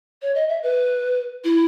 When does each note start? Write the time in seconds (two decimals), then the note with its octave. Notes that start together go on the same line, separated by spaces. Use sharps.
0.21 C#5
0.35 D#5
0.48 E5
0.63 B4
1.44 E4